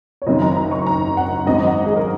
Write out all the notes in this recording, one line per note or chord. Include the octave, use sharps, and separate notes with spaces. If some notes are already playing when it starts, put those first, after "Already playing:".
C#5
F#1 F#2 D#3 D#5
A#5
A#5
C#6
A#5
F#5
G#1 F#2 D#3 D#5
F#5
G#4
A#4